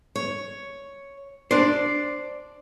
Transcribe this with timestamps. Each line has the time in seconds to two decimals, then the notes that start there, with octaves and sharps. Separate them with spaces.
0.16 C#5
1.51 D4 C5 D5